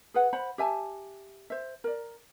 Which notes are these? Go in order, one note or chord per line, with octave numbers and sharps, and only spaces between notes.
G#4 B4 F#5
C5 F#5 B5
G4 E5 G#5 A5
C5 E5
A#4 D5